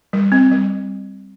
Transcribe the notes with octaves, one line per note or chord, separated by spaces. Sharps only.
G3
C4
G3